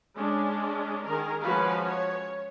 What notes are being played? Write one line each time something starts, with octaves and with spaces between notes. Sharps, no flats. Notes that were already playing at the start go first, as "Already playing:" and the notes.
G#3 C#4 D4
D#3 G#4 A#4
F3 G#3 C#4 F#4 B4 F5
C#5